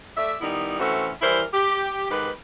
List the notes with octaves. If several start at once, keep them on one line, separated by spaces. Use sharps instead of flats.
A3 D5 E5
D#3 G3 B3 D#4 E4
E3 A3 C4 C#4 F#4
E3 G3 E4 A#4 C5
G4
G#2 D#3 G4 B4